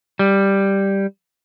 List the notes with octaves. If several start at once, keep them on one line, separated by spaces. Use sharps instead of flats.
G3